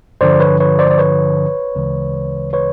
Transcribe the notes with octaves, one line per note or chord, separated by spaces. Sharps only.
G2 D3 F3 C5 D5
B4 C#5
B4 C#5
C5 D5
D5
B4 C#5
D2 C#3 E3 G#3
B4 C#5